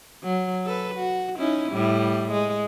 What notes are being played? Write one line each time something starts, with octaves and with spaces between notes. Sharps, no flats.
F#3
A4 B4
F#4
C#4 D#4 E4
A2 G3
G#3